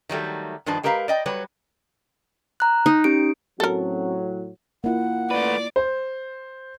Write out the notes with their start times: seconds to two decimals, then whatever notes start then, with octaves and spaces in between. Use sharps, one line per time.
0.09 D#3 F#3 G3 A3
0.66 G2 D#3 F3 D4 B4 A5
0.83 G#3 G4 A#4 B4 E5 F5
1.08 D5 D#5 G5
1.26 F#3 G3 B4 C#5
2.60 A#5 F#6
2.86 D#4
3.04 C#4 G4 D7
3.60 A2 F#3 C4 C#4 F#4 A4 A#4
4.84 A#3 E4 F4 F#5
5.31 A3 B4 D5
5.76 C5